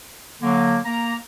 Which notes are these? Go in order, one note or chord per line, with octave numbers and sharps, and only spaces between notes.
D3 F#3 A#3
A#3 A#5